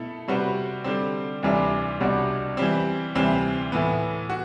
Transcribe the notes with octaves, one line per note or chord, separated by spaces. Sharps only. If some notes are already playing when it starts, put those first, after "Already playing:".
Already playing: B2 A3 E4 A4
C3 G3 C4 F#4 B4
D3 G3 C4
D2 C3 E3 G3 D4
C2 B2 G3 D4 F#4
E3 G3 C4
D2 C3 E3 G3 C4
A2 E3 B3
F#4